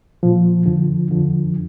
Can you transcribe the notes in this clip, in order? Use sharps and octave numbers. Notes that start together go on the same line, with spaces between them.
A#2 F3
F2 D3 F3
F2 D3 F3